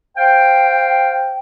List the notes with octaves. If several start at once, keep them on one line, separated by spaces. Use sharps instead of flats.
C5 F5 G5